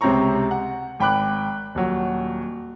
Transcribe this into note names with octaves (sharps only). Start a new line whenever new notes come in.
C#2 C3 C4 C#5 A#5 C#6
F#5
G#1 G5 B5 D6 F#6
D#1 F#3